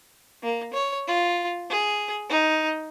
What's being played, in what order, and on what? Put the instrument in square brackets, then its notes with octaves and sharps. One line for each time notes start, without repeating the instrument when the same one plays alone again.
[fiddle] A#3
C#5
F4
G#4
D#4